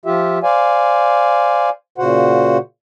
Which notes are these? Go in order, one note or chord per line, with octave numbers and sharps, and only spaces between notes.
F3 F4 G4 E5
C5 D5 F5 G#5
A#2 C#3 F#4 C5 F#5